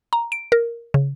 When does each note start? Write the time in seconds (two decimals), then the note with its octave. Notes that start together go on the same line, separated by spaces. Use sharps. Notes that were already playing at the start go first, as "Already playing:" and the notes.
0.13 A#5
0.32 D7
0.52 A#4
0.94 C#3